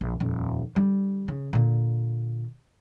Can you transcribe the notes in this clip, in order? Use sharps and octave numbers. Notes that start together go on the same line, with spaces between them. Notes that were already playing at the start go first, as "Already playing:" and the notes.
A#1
D#1 F2
D3 G3
C#3
A#2 D3